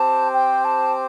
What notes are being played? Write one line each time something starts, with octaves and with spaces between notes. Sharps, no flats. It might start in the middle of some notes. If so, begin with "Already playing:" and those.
Already playing: C4 G4 C5 A5
G5
A5